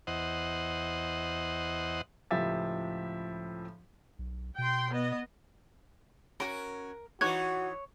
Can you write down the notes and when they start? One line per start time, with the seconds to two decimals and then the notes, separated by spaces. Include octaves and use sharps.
0.07 E2 C5 D#5 F#5
2.31 C#2 A2 F3 G4 E5 A6
4.19 B1
4.58 B2 G5 C6
4.92 B3 D#5
6.40 C#4 F#4 A#4
7.21 E3 D#4 F#4 C#5 C#6 F#6 G#6